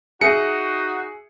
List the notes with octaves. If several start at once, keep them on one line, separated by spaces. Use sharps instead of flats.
D#4 F#4 G#4 E5 C#7